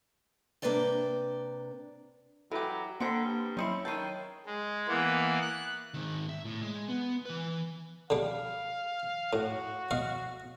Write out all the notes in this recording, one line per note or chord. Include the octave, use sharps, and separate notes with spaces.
C3 A#3 D4 B4 D5 G5
E3 F#3 G4 A4
D3 A#3 C4 A#5 B5 C#7 D7
G2
F#3 C4 C#4 D#4 E4 C#7 F#7
D#3 A4 C#5 G6 C7 D#7
G#3
E3 A#3 B3
F#6
G#2 D#3
E5
A2
G#3
B3
E3 B4
D3 G3 F5
A2 F#4
D#5 F5 C#6